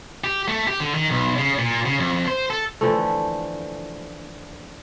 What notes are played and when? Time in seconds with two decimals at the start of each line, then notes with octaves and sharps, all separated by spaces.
0.24 G4
0.48 A3
0.68 G4
0.80 D3
0.94 D#3
1.11 B1
1.38 C#3
1.59 A#2
1.86 C#3
2.00 F2
2.28 C5
2.50 A4
2.81 D3 E3 F3 A3